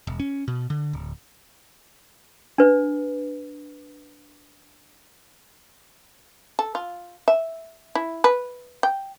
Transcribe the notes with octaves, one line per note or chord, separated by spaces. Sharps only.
E1
C#4
B2
D3
D1
D4 B4
A4
F4
E5
E4
B4
G5